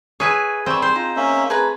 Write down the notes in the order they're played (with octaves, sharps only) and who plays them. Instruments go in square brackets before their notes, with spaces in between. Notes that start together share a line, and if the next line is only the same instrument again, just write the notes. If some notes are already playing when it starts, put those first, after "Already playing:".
[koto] G#4 B4 [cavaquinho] C#5 E5 G#5
[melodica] G3 [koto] C4 [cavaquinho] E5 C#6
[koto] C5 [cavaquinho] C6
[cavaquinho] D#4 [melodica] F4
[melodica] A#3 C#4 E5
[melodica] A3 [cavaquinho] G#4 B4 A#5